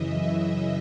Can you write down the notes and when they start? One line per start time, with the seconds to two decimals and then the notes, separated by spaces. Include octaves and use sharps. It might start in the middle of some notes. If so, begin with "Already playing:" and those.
Already playing: F#2 C#3 E3 D#5 E5
0.11 E5
0.41 D#5